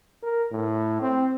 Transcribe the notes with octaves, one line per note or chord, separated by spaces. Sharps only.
A#4
A2
C4